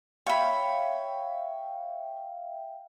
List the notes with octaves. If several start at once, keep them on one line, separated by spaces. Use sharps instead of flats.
C#5 E5 F5 G5 B5